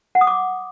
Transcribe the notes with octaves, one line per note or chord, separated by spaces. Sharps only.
F#5
D#6
D6